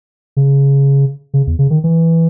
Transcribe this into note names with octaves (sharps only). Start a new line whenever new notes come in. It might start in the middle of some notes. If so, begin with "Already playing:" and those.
C#3
C#3
E2
C#3
D#3
E3